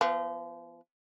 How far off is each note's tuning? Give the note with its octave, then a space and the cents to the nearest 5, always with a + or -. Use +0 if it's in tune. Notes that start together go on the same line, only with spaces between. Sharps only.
F3 -35 B3 +0